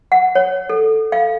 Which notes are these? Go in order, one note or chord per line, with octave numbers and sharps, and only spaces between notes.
F#5
C#5
A4
F5